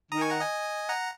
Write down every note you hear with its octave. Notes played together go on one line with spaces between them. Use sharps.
D#3 A#5 D#6
G#5 C#6
F#5 A#5
D#5 G#5
F#5 A#5